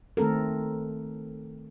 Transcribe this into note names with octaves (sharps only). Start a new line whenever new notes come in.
D#3 A3 C4 A4 A#4